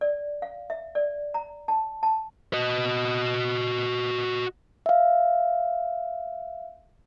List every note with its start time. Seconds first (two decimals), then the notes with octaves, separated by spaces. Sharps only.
0.01 D5
0.42 F5
0.70 E5
0.95 D5
1.34 A#5
1.68 A5
2.03 A5
2.53 F#4 D#5
4.86 E5 F5